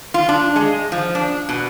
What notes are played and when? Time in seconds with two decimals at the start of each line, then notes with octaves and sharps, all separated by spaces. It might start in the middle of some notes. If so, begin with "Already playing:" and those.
0.14 F4
0.29 D4
0.56 G#3
0.92 F3
1.15 D4
1.49 B2